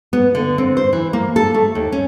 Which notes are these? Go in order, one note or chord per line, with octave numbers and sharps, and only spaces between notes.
B3
D3
C4
C5
E3
A#3
A4
A3
D#2
C#4